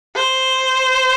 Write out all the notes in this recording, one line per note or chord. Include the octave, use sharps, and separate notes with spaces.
C5